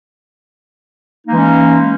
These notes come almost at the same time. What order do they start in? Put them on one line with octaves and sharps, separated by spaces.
D#4 A#3 E3 G#3 C#4